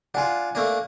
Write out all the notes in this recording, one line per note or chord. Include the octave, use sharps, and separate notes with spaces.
D4 F4 F#5 G#5
A3 A#3 D4